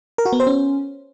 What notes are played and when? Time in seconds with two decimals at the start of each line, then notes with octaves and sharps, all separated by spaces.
0.18 A#4
0.25 F#4
0.33 B3
0.40 C5
0.47 C#4